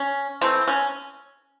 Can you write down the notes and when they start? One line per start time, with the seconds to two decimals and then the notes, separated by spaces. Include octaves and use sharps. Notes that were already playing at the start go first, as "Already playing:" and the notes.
Already playing: C#4
0.41 E3 A3 C4
0.68 C#4